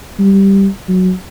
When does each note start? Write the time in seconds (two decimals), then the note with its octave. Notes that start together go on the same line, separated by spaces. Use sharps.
0.19 G3
0.88 F#3